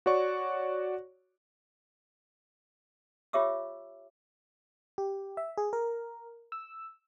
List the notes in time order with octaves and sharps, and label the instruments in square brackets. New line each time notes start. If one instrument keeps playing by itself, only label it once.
[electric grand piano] F#4 C#5 D5 C#6
[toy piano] F4 G4 C#5 E5 D6 E6
[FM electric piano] G4
E5
G#4
A#4
E6